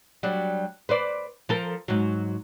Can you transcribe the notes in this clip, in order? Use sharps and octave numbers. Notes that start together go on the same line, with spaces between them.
F#3 G3 D4
B4 C5 D5
F3 A4 A#4
G#2 F#3